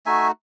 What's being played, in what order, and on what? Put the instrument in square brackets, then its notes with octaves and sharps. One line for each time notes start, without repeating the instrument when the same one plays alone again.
[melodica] A3 D#4 F#4 E5 G#5